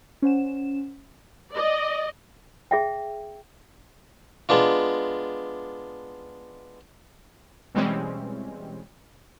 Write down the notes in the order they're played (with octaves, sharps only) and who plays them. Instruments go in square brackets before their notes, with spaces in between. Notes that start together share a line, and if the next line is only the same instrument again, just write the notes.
[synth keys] C#4 C5 F#5 E7
[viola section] D5 D#5
[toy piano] G#4 E5 G5
[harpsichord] G#3 B3 D4 F4
[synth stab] B2 E3 G3 G#3 C4 C#4